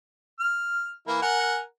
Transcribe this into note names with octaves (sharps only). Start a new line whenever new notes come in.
F6
E3 A#3 E4
A#4 F#5 G#5